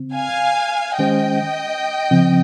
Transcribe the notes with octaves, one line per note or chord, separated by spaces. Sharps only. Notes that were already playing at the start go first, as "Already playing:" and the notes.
Already playing: C#3 C4
F5 G#5
D#3 G#3 C#4 G4 C5 D#5 G5
C#3 F3 C4